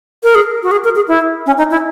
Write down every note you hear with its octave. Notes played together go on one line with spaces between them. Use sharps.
A#4
G#4
F#4
G#4
A#4
G#4
E4
C#4
D#4
E4